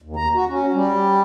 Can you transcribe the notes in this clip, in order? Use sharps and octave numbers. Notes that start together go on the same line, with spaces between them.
D#2
A#5
F#4
C#4
G3